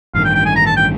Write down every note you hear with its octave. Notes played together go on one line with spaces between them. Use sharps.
A1 G2 D#3 F5
G5
G5
G#5
A#5
A5
G5